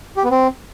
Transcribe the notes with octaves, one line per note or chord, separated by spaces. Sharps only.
G4
B3
C4